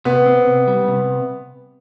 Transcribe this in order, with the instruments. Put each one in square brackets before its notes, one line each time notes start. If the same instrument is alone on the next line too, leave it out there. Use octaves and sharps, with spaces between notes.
[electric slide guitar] C3 [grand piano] B3
[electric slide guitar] C4
C3
G3
C3